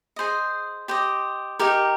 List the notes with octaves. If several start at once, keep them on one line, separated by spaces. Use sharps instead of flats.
G#4 C5 D#5
G4 C5 D#5
D#4 G4 A#4